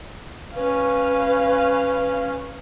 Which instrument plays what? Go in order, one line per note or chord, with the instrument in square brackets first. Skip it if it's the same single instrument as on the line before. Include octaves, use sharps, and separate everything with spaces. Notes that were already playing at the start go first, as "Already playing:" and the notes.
[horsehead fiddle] C#4 F5 [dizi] B4